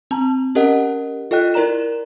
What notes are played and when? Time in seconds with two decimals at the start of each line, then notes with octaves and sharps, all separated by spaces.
0.11 C4 A5 A#5
0.55 C#4 G4 A#4 D#5 F#5
1.31 F4 A4 D#5 G5 F#6
1.54 E4 A#4 D5 A#5 E7